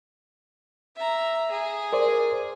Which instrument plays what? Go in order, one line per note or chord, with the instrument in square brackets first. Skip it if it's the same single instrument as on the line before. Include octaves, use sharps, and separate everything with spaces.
[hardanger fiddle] E5 A#5
G#4
[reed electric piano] A#4 C5 D5